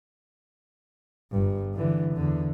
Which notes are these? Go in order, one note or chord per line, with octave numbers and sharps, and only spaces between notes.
G1 G2
D3 E3
E2 D3